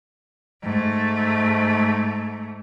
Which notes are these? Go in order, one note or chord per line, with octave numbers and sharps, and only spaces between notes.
G#2 A3